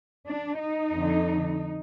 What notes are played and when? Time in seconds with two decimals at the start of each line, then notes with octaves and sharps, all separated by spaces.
0.26 D4
0.59 D#4
0.92 F2 D3